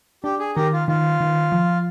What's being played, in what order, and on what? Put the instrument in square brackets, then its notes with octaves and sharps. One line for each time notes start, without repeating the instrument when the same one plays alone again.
[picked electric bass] D4 [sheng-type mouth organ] G4
[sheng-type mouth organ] G#4
[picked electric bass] D#3 [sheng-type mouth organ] G4 A#4
[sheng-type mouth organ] F4
[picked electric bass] D#3 [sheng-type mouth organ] F4
[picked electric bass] D#3
F3